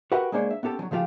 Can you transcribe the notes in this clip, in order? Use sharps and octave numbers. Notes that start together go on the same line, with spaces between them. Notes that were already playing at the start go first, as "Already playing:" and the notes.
F#4 G4 A#4 B4 E5 F#5
G#3 A#3 D4 C5 C#5
E5
B3 C#4 G4 A4
F3 F#3
C#3 F3 A3 F4 G4